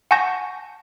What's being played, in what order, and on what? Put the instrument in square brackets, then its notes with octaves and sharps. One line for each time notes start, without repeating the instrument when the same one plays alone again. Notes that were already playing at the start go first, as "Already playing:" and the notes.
[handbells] F#5 G#5 A5 C#6 G6 A#6